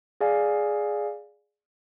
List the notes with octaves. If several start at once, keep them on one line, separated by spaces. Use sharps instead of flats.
G#4 D5 F5 G#5